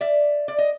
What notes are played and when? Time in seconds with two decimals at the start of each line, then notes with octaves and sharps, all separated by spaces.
0.01 D5 E5
0.48 D5
0.58 D#5